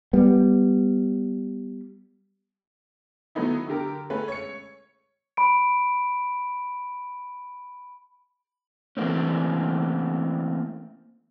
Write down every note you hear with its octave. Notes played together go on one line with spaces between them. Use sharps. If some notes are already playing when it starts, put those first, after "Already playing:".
G3 B3
D#3 F#3 A3 B3 D#4 E4
D3 G4 A#4
G#3 A3 C#4 B4
C#5 C#7
B5 D7
E3 A3 A#3 C4 C#4